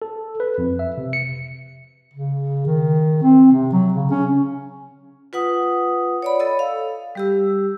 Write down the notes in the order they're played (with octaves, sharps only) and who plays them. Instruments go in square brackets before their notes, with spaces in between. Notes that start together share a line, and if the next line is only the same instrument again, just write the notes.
[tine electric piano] A4
B4
F2
E5
C3
C#7
[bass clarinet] C#3
D#3
C4
C3
F#3
C#3
C#4
[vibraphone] F4 B4 F#5 D#6
C#5 D5 B5
A4 C#5 D#5 E6
F5
G3 G4 E6